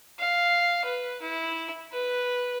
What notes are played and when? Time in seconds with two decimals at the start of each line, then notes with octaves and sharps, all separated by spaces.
0.19 F5
0.84 B4
1.21 E4
1.92 B4